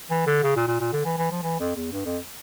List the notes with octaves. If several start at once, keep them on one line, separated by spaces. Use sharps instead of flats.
E3
D3
C#3
A#2
A#2
A#2
D3
E3
E3
F3
E3
F2
E2
G2
F2